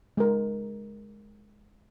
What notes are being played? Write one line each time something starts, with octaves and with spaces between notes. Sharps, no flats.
G#3 A#4